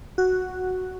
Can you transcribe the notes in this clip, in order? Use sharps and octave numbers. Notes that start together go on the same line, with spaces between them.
F#4